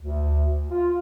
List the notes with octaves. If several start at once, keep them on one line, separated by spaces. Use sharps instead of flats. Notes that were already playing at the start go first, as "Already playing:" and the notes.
D2
F4